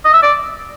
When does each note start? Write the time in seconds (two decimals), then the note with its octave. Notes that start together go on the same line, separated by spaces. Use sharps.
0.05 D#5
0.13 E5
0.23 D5